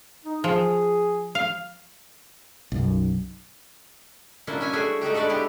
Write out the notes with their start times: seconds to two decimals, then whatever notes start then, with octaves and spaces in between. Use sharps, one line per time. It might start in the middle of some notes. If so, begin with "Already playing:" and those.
0.25 D#4
0.44 F3 G#4
1.35 F5
2.72 B1 F#2
4.47 F#3 A#3 C#4 D4 E4
4.60 C#4 C#5 E5 G#5
4.73 G3 A3 D4 F#4 G#4 E5
5.01 A3 D#4 F#4 G4
5.14 G#3 A3 D4 B4 D5
5.29 B3 D4 E4 G4